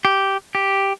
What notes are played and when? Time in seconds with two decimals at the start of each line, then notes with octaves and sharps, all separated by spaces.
0.05 G4
0.55 G4